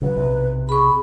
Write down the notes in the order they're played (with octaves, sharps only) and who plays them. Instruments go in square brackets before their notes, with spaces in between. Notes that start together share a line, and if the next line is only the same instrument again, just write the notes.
[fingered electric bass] C#3 F#3 [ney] B4
[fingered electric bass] B1 C3
[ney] G#4 [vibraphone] B5 C#6